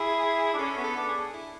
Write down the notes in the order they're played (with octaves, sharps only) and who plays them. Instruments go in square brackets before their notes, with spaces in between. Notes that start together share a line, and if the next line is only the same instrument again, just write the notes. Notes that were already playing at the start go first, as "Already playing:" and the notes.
Already playing: [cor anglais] E4 [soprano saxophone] G#4
[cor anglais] D4
[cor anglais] C#4 [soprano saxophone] A4
[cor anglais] B3
[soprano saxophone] A4
[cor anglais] D4
[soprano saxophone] G#4
E4